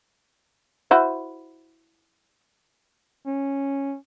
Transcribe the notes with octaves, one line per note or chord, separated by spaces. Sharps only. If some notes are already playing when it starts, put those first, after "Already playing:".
E4 F#4 C5
C#4